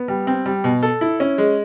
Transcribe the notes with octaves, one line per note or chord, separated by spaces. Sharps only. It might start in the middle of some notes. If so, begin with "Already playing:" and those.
Already playing: B3
G3
C4
G3
B2
A4
E4
C#4
G#3